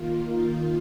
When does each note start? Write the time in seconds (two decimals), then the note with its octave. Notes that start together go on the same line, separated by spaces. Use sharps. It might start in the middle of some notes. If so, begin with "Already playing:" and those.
Already playing: D#3 A#3 F4
0.29 D#4